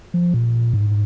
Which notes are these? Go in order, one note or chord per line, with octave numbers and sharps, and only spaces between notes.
F3
A#2
G#2